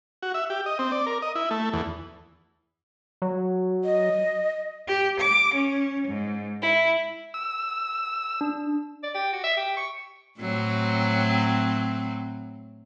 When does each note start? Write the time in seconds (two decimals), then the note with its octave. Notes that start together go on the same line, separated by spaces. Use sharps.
0.22 F#4
0.34 E5
0.50 G4
0.66 D#5
0.79 C4
0.92 D5
1.06 A#4
1.22 D#5
1.35 E4
1.51 A3
1.73 E2
3.22 F#3
3.84 D#5
4.88 G4
5.20 D6
5.54 C#4
6.08 G#2
6.62 E4
7.34 E6
8.41 D4
9.03 D5
9.15 G4
9.33 F#4
9.44 E5
9.57 G4
9.77 C#6
10.39 A2 F#3 C4